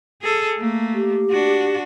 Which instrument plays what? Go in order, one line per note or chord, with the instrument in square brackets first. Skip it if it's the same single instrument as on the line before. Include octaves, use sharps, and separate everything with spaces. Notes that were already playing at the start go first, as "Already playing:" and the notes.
[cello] G#4 A4
A3 A#3
[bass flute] G4
[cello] D4 F#4